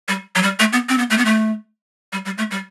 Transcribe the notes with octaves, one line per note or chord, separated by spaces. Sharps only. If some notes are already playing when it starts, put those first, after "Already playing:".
G3
F#3
G3
A3
B3
C4
B3
A3
B3
A3
G3
G3
A3
G3